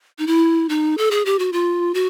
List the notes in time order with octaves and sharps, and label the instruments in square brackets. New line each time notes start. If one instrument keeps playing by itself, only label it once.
[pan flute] D#4
E4
D#4
A4
G#4
G4
F#4
F4
F#4